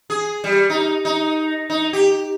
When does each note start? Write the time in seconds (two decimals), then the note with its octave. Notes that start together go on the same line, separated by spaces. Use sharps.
0.10 G#4
0.44 G3
0.70 D#4
1.05 D#4
1.70 D#4
1.93 G4